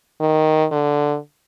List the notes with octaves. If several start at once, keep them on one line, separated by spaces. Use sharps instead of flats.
D#3
D3